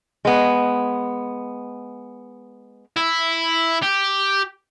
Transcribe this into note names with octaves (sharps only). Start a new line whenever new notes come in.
G#3 B3
E4
G4